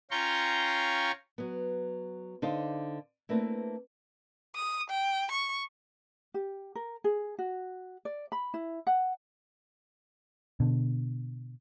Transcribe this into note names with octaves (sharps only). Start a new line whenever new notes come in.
C#4 F4 G5 A#5 C6 C#6
F#3 B3
D3 D#4 C5 F5
A3 A#3 C4 D4 E4 B4
D#6
G5
C#6
G4
A#4
G#4
F#4
D5
B5
E4
F#5
B2 D3